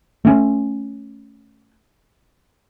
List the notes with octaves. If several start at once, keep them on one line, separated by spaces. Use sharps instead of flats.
A3 C#4